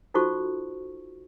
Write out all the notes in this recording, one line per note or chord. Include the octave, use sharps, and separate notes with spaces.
D#4 F4 F#4 A4 C5 C#6